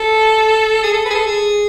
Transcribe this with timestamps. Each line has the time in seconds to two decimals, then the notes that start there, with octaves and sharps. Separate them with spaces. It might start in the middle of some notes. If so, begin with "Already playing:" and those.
Already playing: A4
0.83 G#4
0.93 A4
1.05 B4
1.10 G#4
1.15 A4
1.26 G#4